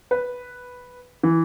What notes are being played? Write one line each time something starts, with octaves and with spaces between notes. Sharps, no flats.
B4
E3